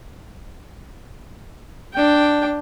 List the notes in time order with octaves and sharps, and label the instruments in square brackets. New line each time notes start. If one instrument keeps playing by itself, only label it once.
[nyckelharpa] D4 G5